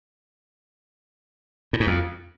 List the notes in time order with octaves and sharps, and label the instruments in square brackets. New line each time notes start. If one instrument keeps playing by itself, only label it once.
[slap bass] A2
G#2
F2